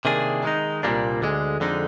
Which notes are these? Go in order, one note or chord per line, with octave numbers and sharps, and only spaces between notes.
C3 D#3 A#3 D4 G#4
D#3 G#3 D#4
C2 A#2 G3 A#3 D4
D2 D3 G#3
F2 D3 G#3 D#4